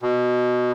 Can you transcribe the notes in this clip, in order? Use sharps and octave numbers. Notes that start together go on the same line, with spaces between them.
B2